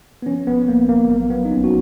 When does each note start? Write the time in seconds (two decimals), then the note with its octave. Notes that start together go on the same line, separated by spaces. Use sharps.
0.22 B3
0.26 F3 C#4
0.47 G#1 B3
0.68 G#1 A#3
0.89 G#1 A#3
1.10 F#3 A#3
1.30 F#3 B3
1.45 D#4
1.51 A#1 C#4
1.64 F#4